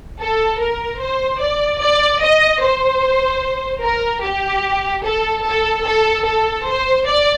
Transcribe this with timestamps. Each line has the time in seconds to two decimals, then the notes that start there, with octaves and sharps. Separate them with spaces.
0.20 A4
0.60 A#4
1.01 C5
1.41 D5
1.81 D5
2.21 D#5
2.62 C5
3.83 A#4
4.24 G4
5.04 A4
5.45 A4
5.85 A4
6.26 A4
6.66 C5
7.06 D5